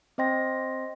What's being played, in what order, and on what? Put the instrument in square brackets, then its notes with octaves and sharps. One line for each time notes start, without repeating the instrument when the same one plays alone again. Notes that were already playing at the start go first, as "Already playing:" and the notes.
[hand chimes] C4 C5 D#5 G5 C6 A#6